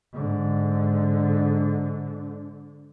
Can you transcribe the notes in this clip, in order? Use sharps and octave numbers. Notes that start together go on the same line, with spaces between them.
G#2 D3